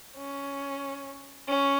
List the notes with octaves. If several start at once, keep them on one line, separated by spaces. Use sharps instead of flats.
C#4
C#4